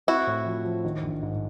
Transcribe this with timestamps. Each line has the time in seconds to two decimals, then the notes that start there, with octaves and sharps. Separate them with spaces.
0.07 C4 E4 F#4
0.27 A2
0.46 F3
0.65 F3
0.85 D#3
1.03 A#1
1.23 G#2